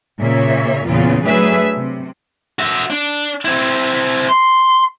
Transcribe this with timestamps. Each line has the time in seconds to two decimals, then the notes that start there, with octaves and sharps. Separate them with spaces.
0.19 A#2 C#3 A#3 C#5 E5
0.87 E2 A#2 C#3 B3 F4
1.24 F#3 A3 D4 G#4 B4 E5
1.74 C3
2.59 F#4 E5
2.90 D4
3.45 C4 E4
4.29 C6